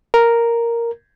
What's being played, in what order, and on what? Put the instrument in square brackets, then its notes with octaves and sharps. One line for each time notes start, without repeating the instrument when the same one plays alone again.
[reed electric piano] A#4